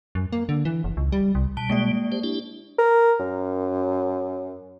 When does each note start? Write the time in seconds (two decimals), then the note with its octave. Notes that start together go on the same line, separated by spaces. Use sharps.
0.15 F#2
0.32 A#3
0.49 D3
0.65 E3
0.84 F#1
0.97 C#2
1.12 G3
1.35 C2
1.57 B2 G3 A5
1.69 G#3 A#3 D5
2.12 G4 C5
2.24 D4 E4 G4
2.78 A#4
3.20 F#2